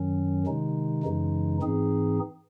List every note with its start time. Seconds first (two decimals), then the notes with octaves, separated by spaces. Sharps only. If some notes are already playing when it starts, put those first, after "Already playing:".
Already playing: F#2 D#3 F#3 C#4
0.46 C3 D#3 G#3 D#4
1.04 F#2 C#3 E3 G#3 D#4
1.62 G#2 E3 C4 D#4 G#4